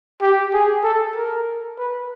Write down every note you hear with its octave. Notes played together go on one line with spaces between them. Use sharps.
G4
G#4
A4
A#4
B4